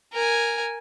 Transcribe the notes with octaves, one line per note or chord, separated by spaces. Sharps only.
A#4 G#5